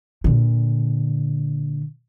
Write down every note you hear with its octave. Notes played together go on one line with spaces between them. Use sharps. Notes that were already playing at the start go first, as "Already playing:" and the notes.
A#2 D3